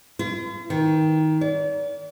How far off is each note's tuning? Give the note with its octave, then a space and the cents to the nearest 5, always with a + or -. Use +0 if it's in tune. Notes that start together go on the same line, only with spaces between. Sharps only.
F4 -45
D#3 +15
D5 -35